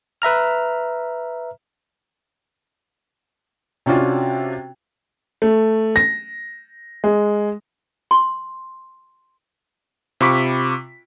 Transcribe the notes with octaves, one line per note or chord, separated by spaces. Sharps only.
B4 E5 A#5 F6
C3 C#4 D4 F4 F#4
A3
A#6
G#3
C6
C3 F4 B5 C#6 D6 B6